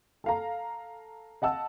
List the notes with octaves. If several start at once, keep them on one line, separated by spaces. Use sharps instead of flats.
A4 F5 A#5
D#5 F#5 A5 E6